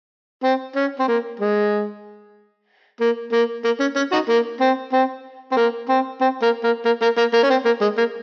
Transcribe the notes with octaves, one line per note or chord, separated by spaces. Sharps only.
C4
C#4
C4
A#3
G#3
A#3
A#3
A#3
C#4
C#4
D#4 F#4
A#3
C4
C4
C4
A#3
C4
C4
A#3
A#3
A#3
A#3
A#3
A#3
C#4
C4
A#3
G#3
A#3